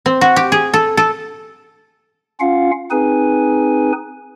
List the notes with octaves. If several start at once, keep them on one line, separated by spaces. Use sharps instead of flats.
C4
F#4
G4
G#4
A4
A4
C#4 F4 F5 F#5
C4 D#4 G#4 B4 G#5